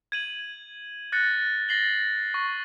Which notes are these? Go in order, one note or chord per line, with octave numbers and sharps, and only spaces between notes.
G#6 D#7 F#7
F#6 A6 A#6 C#7
A6 A#6 C7 F#7 G7
C#6